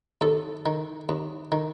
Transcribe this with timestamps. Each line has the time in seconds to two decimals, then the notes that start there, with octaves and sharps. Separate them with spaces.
0.21 D#2 A4
0.66 D#3
1.09 D#2
1.52 D#3